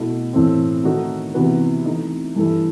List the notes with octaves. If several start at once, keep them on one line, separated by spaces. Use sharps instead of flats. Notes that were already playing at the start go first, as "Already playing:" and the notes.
Already playing: B2 A3 E4
A2 E3 A3 C4
D#3 A3 D#4 F#4
C3 E3 B3 F#4 B4
E3 A3 D#4
G2 E3 A3 E4 A4